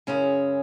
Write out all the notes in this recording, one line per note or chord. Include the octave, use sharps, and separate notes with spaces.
F#2 C#3 G#3 C#4